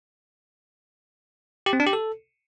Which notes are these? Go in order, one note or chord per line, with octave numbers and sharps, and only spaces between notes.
G4
C4
D4
G4
A4